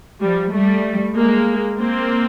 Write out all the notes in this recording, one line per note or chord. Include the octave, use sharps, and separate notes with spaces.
F3 G3
G3 A3
G#3 A#3
A#3 C4